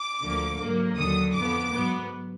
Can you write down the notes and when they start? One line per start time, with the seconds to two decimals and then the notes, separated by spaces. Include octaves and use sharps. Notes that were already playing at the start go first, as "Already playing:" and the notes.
Already playing: D6
0.21 D2 D3 F3 A#3
0.59 G#2 F#3 A#3
0.96 D#2 D3 F#3 D#6
1.33 F2 F3 B3 D6
1.72 G#2 F#3 B3